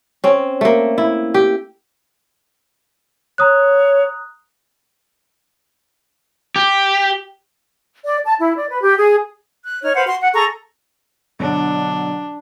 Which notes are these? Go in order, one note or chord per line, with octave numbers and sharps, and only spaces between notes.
C4 C#4
A3 A#3
E4
G4
C#5 A#5 D#6 F#6
G4
D5
A5
E4
D5
B4
G4
G#4
F#6
D#4 C#5 F6
B4 C5 F5 F#5
F#4 C6
F#5
G#4 A4 A#5 C#6
B2 D3 F#3 D4